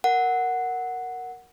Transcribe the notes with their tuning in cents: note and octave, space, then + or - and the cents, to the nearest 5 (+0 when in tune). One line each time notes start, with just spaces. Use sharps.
A#4 +0 F#5 +0